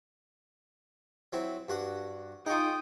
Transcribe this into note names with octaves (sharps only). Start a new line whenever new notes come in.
F#3 C4 E4
G2 F#4 F#5
D#4 F4 G#4 G5 C#6 D#6